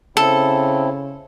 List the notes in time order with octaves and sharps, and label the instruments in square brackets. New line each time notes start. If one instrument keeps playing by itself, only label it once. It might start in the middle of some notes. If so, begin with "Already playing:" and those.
[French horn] C#3 [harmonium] C4 E4 [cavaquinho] A4